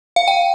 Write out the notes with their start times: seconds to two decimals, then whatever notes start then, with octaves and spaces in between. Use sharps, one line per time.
0.16 F5
0.28 G5